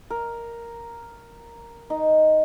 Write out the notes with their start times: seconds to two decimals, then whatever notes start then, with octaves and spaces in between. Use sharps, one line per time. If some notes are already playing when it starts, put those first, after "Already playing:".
0.10 A#4
1.90 D#4